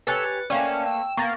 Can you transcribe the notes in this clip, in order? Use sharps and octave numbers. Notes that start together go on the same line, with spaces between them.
G4 A4 B4 C#5 G#5 F#6 C#7
A6
A3 A#3 C#4 B4 D5 G5
G5 E6
A#3 B3 C#6 A6 A#6